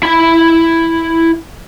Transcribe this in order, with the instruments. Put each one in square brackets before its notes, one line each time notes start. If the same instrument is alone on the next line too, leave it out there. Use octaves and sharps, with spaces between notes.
[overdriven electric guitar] E4 B5